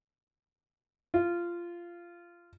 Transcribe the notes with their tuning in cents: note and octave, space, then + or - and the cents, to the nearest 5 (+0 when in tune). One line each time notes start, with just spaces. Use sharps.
F4 -15